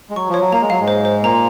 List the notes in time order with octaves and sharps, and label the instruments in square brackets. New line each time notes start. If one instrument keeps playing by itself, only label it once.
[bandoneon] G#3
[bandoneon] F#3 [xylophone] C#6
[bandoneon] F3
[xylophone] C#5
[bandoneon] F#3
[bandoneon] A#3 [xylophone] A#5
[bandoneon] G#3
[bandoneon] F#3 [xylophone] F5
[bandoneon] G#2 G#3
[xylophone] C5
C5
[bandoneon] A#2 A#3 [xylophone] A#5